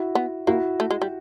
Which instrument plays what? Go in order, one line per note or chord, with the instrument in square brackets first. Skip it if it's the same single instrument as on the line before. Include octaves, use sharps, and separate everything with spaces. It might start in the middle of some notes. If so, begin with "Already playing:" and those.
Already playing: [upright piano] E4 F#4
[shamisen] B3
[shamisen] A#3 [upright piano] E4 F#4
[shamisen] A3
G#3
G3